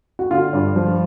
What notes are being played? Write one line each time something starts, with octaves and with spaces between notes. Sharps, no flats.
F#4
D3 F4
G2
F3